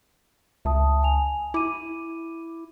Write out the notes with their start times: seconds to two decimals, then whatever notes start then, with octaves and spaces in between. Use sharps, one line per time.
0.65 C#2 E5 A5 D#6
1.03 G#5 F7
1.54 E4 D6 D#7